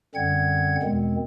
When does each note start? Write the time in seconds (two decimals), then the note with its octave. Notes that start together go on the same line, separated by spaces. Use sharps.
0.15 F#2 D3 G3 C4 F#5 G#6
0.83 E2 B2 D#3 G#3 C4